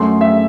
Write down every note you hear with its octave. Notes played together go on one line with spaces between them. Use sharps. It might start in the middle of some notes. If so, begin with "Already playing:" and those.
Already playing: F#2 F#3 A3 C6
E5